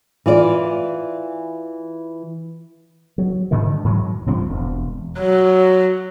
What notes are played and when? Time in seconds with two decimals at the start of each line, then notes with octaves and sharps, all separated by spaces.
0.26 E3 F4 D5
3.18 F#3
3.51 G#2 D3 D#3 G#3
3.84 G#2 E3 F#3
4.26 C2 G2 F3 C4
4.50 E1
5.19 F#3